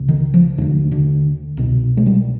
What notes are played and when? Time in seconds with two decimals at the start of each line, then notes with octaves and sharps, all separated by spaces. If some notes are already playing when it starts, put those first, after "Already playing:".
Already playing: C#2 C#3
0.08 D#3
0.34 F3
0.58 D#2 F#3
0.61 D3
0.91 D3
1.57 C2 B2
1.97 G#3
2.06 G3